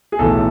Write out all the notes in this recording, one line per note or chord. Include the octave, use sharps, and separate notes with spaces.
G#4
B1 A2 E3 A4